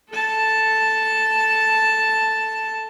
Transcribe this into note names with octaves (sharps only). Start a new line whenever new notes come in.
A4 A5